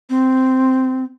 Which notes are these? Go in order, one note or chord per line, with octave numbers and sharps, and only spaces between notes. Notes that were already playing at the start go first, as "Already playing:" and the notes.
C4